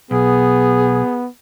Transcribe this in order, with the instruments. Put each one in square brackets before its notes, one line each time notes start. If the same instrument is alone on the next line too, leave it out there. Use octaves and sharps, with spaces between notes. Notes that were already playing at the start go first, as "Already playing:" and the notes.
[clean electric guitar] B1 [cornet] B3 [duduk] G#4